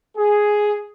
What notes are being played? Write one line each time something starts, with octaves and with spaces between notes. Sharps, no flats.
G#4